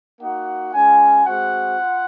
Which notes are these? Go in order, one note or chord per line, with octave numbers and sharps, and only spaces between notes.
A#3 D#4 F#4 F#5
G#3 C#4 F4 G#5
G#3 C4 F#4 F#5
F4